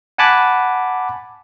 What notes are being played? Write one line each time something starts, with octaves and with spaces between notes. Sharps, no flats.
F#5 G#5 A5 B5 D6 F#6